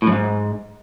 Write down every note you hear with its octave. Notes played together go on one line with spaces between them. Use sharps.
A2
F#2
G#2